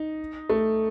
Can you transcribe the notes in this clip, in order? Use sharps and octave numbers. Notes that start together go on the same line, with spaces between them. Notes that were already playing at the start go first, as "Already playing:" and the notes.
Already playing: D#4
A3